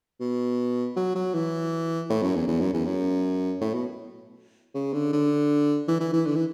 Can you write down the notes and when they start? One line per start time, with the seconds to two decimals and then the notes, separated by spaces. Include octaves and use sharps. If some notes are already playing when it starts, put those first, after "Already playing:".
0.20 B2
0.96 F#3
1.15 F#3
1.34 E3
2.10 A2
2.23 F#2
2.35 E2
2.48 E2
2.60 F#2
2.73 E2
2.85 F#2
3.61 A2
3.74 B2
4.75 C#3
4.93 D3
5.13 D3
5.88 E3
6.00 E3
6.13 E3
6.26 D3
6.36 E3